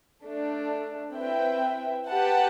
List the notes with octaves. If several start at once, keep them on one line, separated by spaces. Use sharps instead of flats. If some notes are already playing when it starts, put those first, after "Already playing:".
A3 D4 A4
C4 E4 B4 E5 G5
G4 B4 F#5 A5